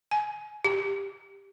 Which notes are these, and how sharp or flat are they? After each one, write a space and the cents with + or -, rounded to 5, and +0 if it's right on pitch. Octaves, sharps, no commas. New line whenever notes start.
G#5 +20
G4 +15